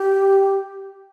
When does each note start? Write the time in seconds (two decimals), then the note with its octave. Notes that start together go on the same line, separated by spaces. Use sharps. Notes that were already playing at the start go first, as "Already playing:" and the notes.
Already playing: G4